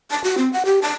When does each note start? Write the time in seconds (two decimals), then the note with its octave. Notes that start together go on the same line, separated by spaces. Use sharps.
0.11 A5
0.24 F#4
0.38 C4
0.53 F#5
0.65 G4
0.82 A5